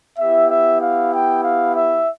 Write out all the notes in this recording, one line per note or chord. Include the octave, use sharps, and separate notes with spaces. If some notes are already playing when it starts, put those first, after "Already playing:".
B3 E4 G4 E5
E5
F5
G5
F5
E5